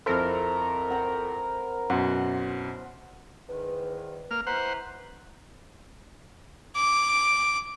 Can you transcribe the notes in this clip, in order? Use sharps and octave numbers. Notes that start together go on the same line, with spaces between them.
F2 C4 E4 A4 A#4
F#5 G5 A#5
F#2 B2 F#5 C6
E2 G#2 D#3 B4
A#3 F6
E3 B4 C5 F#5 A#5
D6